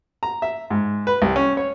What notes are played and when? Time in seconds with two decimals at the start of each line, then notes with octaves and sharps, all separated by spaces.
0.23 A#5
0.42 E5
0.70 G#2
1.07 B4
1.22 C2
1.36 C#4
1.57 C#5